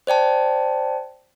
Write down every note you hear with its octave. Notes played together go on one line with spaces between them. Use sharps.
C5 D5 G5 A5